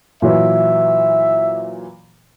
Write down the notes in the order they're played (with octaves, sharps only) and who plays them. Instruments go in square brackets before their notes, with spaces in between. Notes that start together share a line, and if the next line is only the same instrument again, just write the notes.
[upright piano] A#2 E3 F#3 [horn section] E5